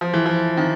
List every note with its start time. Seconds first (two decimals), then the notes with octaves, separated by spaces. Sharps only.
0.01 F3
0.13 E3
0.26 F3
0.57 D#3